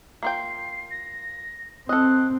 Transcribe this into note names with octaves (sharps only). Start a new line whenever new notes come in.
A#3 F4 G5 C7
A#6
C4 A4 D#5 F#6